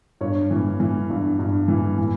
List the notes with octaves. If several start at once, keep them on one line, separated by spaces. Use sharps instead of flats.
G2 C#5
E3
E3
G2
G2
E3
E3